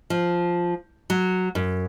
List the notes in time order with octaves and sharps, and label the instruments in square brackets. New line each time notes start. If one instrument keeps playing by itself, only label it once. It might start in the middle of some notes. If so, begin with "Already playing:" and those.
[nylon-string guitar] F3
F#3
F#2